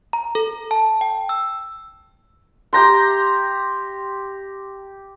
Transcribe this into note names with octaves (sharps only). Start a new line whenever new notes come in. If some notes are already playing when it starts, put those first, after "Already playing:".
A#5
A4
A5
G5
E6
G4 G5 A#5 C6